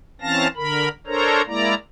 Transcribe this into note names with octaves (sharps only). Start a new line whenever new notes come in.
E3 C4 C#4 F5 A5 A#6
D3 A#4 B5
D4 A4 A#4 C5 C#5 A#5
G#3 A#3 E4 D5 A#5